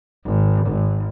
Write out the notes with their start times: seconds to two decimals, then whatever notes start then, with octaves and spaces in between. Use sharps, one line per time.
0.25 G#1
0.66 G#1